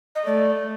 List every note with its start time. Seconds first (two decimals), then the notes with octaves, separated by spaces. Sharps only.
0.15 D#5
0.25 A3 D5